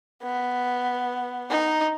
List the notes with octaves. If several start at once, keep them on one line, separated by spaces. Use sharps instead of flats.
B3
D#4